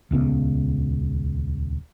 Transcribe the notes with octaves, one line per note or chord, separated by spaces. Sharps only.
D#1 C#2 C#3 B3